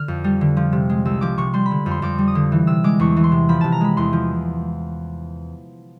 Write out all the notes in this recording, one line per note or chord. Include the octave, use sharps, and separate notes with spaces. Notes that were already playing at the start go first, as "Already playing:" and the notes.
Already playing: D3 F6
F2
G3
D3
F3
C3
G#3
C2 E6
F3 D6
C3 C#6
G3 C6
B5
D3
F2
C6
F2 D6
G3
D#6
D3
E3
C3 E6
G#3 D6
E2 C#6
E3
C6
C3
F3 B5
C3 A5
A#5
G#3 B5
E2 C6
F3